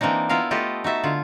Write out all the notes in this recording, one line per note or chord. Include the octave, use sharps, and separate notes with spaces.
E3 A#3 C4 D4 D#4
B3 E4 F4 A#4 F5
A3 F4 G4 A4 B4 D#5
D#4 F#4 E5 A5
D3 F4